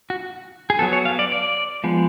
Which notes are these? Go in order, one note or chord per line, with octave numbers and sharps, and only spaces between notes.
F#4
G#4
F#3 B3 A4
C#5
F5
D5
D5
F3 G#3 B3